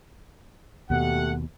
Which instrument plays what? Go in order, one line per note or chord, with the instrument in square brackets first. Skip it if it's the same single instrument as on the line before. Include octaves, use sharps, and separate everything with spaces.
[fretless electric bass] D#2 B2 [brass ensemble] A3 G4 F#5